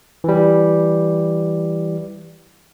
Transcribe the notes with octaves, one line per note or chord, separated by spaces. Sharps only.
E3 G3